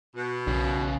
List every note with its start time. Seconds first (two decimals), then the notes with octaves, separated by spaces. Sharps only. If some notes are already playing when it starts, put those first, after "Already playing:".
0.16 B2
0.47 B1 E2 C#3